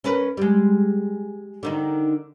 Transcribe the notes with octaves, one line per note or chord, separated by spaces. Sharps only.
C#4 A#4 B4
G3 G#3
D3 D#3 D#4